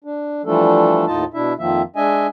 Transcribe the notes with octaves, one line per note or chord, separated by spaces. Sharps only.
D4
E3 F3 G3 A3 D4 A4
D#2 A2 D#4 F4 D#5 A5
B2 D4 E4 E5
F2 D#3 F3 A#3 E5
G#3 D4 D#5 E5 G#5